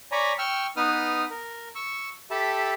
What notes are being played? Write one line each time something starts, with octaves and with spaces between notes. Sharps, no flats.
C#5 D5 G#5 A#5 B5
G5 C#6 E6 F6
B3 D#4 B4 D#6 F6
A#4
C#6 E6
G4 A4 E5 A5 B5